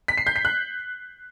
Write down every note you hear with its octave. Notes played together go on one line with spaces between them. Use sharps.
B6
C7
G6
B6
F#6